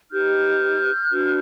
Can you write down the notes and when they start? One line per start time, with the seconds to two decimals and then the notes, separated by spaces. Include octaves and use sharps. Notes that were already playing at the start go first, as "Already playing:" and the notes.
0.11 D#4 G4 B4 F6 G6
1.11 D4 F#4 B4